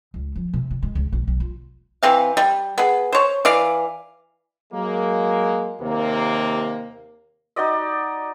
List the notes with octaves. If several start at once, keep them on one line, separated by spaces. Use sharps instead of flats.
C#2
F3
C3
G3
G#3
C#2
A#1
B1
F4
E3 C4 F5
G3
B3 G#4
C5 C#5
E3 D5 F5
F#3 G#3 A#3
D#2 C3 A#3
D#4 F#4 D5 D#5